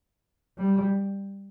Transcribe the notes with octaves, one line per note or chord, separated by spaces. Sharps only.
G3